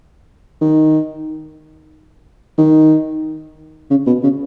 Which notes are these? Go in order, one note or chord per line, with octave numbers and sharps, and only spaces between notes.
D#3
D#3
C#3
B2
C#3